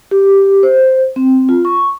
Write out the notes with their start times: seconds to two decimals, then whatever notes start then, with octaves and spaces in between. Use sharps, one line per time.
0.11 G4
0.63 C5
1.16 C4
1.49 F4
1.65 C#6